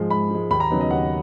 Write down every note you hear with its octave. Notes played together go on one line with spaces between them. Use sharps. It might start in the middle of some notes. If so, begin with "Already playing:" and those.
Already playing: G#2 F3 G#3
G#2 B5
F3 G#3
D#2 B5
A#5
C#3 F#3 B3 D#4
D#5
D#2 F#5